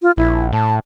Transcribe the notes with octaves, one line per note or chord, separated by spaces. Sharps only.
F4
A#1 E4
A2 A5